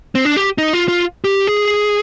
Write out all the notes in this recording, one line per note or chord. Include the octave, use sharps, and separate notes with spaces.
C4
D4
G4
D#4
F4
F4
G4
G#4